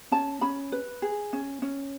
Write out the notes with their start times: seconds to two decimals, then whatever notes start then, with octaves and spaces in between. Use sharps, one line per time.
0.12 C#4 A5
0.41 C#4 B5
0.72 B4
1.02 G#4
1.33 C#4
1.62 C#4